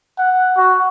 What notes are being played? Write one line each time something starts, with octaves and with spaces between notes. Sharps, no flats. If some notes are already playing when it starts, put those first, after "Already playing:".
F#5
F#4